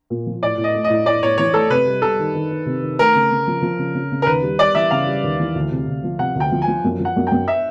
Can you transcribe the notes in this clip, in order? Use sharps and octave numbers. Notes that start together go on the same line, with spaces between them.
A#2
F3
A2 D5
A2
D#5
A3
D#5
A2
A2 D5
A2 C#5
E3 C#5
A3 A4
C3 B4
G3
G3 A4
D#3
D#3
D#3
C3
D#3
A3 A#4
C#3
C#3
F3
F3
C#3
C#3
C#3
A#4
D#2 B4
G3
G3 D5
E3 E5
C#3 F5
G3
D#2
E3
D2
C3
D2
F3
C3 F#5
D2 G5
F3
G#5
F3
F#2
F3
F#5
F#2
F#2 G5
E5